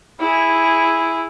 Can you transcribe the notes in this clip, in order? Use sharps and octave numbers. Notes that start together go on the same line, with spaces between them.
E4 G#4